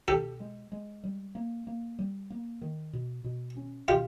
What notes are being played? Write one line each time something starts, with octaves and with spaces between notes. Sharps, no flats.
B2 G4 A4
G#3
G#3
G3
A#3
A#3
G3
A#3
D#3
B2
B2
C#4
B2 F4 G4